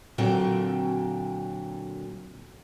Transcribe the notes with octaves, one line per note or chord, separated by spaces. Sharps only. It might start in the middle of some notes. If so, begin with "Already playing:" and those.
A#2 D3 F#3 C4 G5